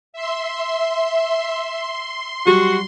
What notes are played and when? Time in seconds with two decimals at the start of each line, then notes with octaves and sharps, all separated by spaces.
0.13 E5 C6
1.67 C6
2.46 F#3 G3 F#4